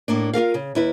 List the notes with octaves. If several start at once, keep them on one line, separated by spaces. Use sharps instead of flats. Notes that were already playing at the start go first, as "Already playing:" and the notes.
A2 A#3 D4
F4 G4 A#4 F5
C#3
D#2 E4 B4